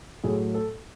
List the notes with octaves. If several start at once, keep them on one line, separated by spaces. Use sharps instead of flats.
A2 F#3 A3 G#4
A4